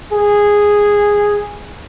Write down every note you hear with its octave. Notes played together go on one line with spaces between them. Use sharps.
G#4